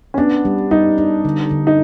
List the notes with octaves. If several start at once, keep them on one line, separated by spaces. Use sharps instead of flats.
C#4
B3 D4
G3
G3 D#4
D4
D3
D3
D#4